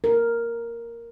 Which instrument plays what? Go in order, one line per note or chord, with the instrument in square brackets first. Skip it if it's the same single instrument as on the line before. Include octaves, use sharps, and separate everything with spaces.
[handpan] A#4